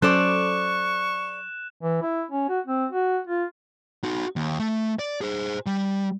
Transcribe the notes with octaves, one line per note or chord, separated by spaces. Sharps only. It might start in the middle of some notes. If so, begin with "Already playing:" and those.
F#3 C#4 A4 C5 D5 C#6 F#6 E7
E3
E4
C#4
F#4
C4
F#4
F4
D#4 F#4
D#2
A3
D5
G#4 C5
G3